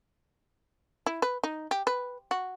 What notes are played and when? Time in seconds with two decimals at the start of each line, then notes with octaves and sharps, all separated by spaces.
1.06 E4
1.22 B4
1.43 D#4
1.71 G4
1.87 B4
2.31 F#4